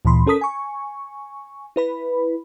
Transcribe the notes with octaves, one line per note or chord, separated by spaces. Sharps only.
D2 A#2 E3 B5 C6
C#4 A4 A#4 D#6 B6
G#5 C#6
E4 B4 B5